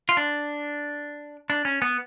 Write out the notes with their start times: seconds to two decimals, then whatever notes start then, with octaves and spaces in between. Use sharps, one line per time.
0.09 F4
0.17 D4
1.50 D4
1.65 C#4
1.82 B3